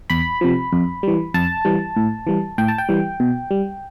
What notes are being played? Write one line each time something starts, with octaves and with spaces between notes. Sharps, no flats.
E2 B5
C3 F3
F2
E3 G3
F2 A5
E3 G3
A2
E3 G3
A2 G5
A5
G5
E3 G3
B2
G3